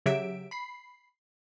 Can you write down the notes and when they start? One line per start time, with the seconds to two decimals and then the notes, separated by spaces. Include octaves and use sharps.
0.06 C#3 F#3 G4 E5 D7
0.51 B5 C7